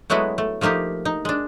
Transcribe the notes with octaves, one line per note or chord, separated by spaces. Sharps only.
F#3 G#3 A3 B3 E4 F#4
A3
F3 A3 A#3 D#4 G4
D#4
G#3 D4